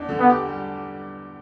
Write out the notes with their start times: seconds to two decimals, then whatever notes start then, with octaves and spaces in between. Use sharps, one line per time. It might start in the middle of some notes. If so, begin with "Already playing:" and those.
Already playing: E2 D4
0.09 D3
0.19 B3
0.29 G4
0.49 G3